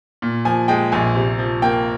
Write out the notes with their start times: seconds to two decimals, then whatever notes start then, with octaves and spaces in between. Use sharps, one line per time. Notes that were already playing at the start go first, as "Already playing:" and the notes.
0.22 A#2
0.45 F3 G#5
0.68 G#3 G5
0.92 A#1 G#5
1.15 C3
1.39 F3
1.62 A#3 G5